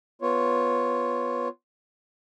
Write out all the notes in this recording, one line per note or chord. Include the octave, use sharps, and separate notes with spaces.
B3 F4 C#5